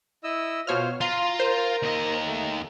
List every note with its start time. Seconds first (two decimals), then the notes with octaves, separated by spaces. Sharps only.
0.24 E4 D#5 E6
0.67 B2 F4 C5 C#5 F6
1.01 F4 F5 A#5 C6
1.40 A#4 C5
1.83 D#2 D#5
2.27 A3